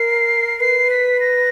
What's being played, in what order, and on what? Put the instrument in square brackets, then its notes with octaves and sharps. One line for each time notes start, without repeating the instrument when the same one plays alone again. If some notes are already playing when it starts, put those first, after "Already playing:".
Already playing: [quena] A#4 [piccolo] C7
[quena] B4 [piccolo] C7
[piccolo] B6
A#6